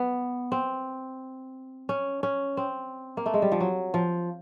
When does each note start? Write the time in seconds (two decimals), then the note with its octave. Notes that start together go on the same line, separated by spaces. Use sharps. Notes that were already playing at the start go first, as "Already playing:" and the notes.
Already playing: B3
0.52 C4
1.89 C#4
2.23 C#4
2.57 C4
3.17 A#3
3.26 A3
3.34 G#3
3.42 G3
3.52 F3
3.60 F#3
3.94 F3